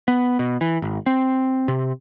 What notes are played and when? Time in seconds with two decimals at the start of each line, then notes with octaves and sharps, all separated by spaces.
0.08 B3
0.39 B2
0.61 E3
0.82 G#1
1.06 C4
1.68 C3